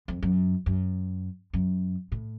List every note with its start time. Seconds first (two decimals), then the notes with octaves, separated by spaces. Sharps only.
0.08 F2
0.23 F#2
0.66 F#2
1.53 F#2
2.12 A2